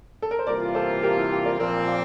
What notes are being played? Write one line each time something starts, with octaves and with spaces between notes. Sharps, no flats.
A4
A#4
C5
C3 E3 G3 A#3 F4 A#4 D5
A4 C5
G4 A#4
E4
E4 G4
A#4 D5
A#2 F3 C4 A#4 D5
D5 F5